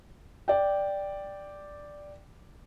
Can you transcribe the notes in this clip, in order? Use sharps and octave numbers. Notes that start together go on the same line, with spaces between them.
D5 G5